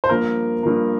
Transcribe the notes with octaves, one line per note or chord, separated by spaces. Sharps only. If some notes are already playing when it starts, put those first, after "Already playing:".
C5
G2 F3 A#3 A#4
G2 F3 A#3